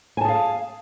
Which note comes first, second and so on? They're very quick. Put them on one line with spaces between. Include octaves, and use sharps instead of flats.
G#5 A5 G#4 F5